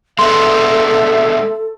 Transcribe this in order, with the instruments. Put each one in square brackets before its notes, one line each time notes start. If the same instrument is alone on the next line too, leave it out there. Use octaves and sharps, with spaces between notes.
[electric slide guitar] G#3 B3 D4 [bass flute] A4 [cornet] E5 [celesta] C6